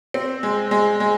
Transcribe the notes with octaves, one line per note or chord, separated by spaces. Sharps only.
C4
G#3
G#3
G#3